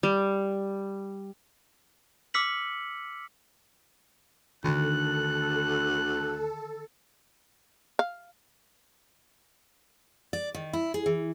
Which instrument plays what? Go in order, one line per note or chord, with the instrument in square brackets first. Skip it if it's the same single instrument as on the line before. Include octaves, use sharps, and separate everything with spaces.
[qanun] G3
[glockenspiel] D6 E6 F6 B6 C#7 F#7
[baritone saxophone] D2 [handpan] D3 D#3 [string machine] A4 [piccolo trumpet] F#6
[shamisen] F5
[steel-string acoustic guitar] D5
D#3
E4
G#4
E3